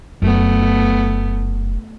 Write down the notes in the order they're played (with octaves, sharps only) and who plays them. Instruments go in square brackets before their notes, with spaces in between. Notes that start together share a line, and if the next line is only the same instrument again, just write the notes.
[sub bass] F1 [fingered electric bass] F#2 [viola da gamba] A3 B3